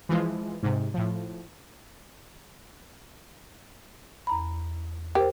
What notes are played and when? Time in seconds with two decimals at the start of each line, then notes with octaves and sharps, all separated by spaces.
0.09 E3 F3 G#3
0.63 G#2 C3
0.94 A2 F3
4.27 E2 A#5 B5
5.15 G4 A#4 C5